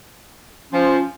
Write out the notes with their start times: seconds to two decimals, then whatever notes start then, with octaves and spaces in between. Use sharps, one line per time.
0.73 F3 C#4